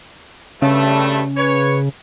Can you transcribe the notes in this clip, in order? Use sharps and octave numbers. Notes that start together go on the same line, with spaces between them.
G2 C#3 A3
B4 C#5